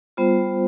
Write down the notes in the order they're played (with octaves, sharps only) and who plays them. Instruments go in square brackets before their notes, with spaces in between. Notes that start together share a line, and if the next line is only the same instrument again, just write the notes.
[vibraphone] G3 B3 F4 C5